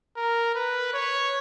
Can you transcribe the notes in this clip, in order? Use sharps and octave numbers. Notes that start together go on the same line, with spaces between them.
A#4
B4
C#5